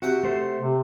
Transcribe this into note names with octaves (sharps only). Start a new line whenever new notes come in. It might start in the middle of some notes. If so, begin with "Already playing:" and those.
C3 F#4 F#5 G5
A3 C5
C3